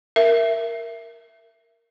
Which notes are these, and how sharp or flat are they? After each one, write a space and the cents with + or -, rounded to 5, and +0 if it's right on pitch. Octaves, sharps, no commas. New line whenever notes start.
A#4 +0 E5 +10